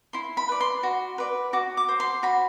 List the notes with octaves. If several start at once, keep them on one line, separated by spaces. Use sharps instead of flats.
E4 C6
B5
B4 D5
C6
F#4
B4 D5
F#4 D6
D6
C5
C6
F#4 B5